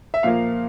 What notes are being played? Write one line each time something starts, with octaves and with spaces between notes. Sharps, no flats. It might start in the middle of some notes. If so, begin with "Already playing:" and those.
E5
A#2 F3 A#3 F5